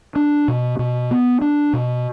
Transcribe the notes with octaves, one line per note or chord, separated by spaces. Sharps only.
D4
B2
B2
B3
D4
B2